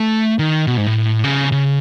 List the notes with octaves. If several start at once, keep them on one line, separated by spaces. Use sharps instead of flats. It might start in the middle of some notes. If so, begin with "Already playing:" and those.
Already playing: A3
D#3
B2
G#2
A2
C#3
C#3